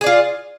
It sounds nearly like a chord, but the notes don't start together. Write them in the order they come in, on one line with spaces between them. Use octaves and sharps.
G#4 D5 F4